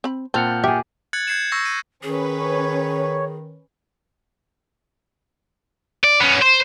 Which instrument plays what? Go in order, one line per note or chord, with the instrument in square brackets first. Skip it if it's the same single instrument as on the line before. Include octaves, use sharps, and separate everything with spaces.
[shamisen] C4 B5
[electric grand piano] A#2 A5 [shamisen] C4 [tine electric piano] F#5 F6 G6
[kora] G4 G#4 [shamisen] E5
[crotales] F#6 G#6 A6 C#7 F#7
G6 G#6 C7 C#7 E7
C#6 E6 G6 A#6 C7
D#7
[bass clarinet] D#3 [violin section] C#4 B4 [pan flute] G#4
[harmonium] C#5
[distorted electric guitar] D5
B3 C#4
C5